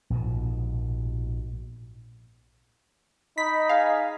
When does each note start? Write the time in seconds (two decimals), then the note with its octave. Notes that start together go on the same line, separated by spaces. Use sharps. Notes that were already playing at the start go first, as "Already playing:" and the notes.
0.10 A#1 G#2 B2
3.38 D#4 B5 B6
3.69 G#4 F5